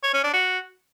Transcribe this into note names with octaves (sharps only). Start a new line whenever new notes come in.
C#5
C#4
D4
F#4